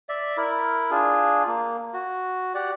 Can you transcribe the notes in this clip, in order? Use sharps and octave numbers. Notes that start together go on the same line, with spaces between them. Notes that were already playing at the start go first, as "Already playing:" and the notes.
D5 E5
E4 A#4
D4 F4 G#4
A#3
F#4
G4 D5 F#5